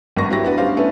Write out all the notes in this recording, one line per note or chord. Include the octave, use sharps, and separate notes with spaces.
G#1 G2 A#3 D4 C#6 A#6
F#3 C4 E4 G4 E5 A#6
B3 D4 F#4 B4
G3 B3 C#4 D4 C5 F5
A3 B3 C#4 D4 E4 B4